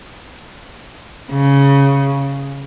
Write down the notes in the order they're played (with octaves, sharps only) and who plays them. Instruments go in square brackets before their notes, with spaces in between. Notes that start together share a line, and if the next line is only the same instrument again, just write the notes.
[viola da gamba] C#3